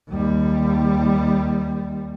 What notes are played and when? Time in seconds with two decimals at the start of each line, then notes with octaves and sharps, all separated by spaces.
0.10 D#2 G3